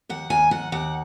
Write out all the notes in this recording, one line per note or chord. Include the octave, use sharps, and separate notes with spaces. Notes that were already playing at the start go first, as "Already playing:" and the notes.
D#2 F#5
D#2 G#5
D#2 F#5
D#2 F#5